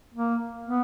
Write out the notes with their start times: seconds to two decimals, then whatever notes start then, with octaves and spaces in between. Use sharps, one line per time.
0.14 A#3
0.66 B3